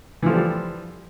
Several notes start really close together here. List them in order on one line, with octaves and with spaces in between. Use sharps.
E3 F3 A4 G3 F4